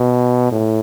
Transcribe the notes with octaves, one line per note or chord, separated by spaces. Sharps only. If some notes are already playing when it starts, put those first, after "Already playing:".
Already playing: B2
A2